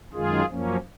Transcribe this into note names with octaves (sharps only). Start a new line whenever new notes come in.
F#2 D#3 G#3 F4 G#4
F#2 F3 A#3 C#4